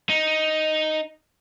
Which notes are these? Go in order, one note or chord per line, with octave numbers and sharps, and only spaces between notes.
D#4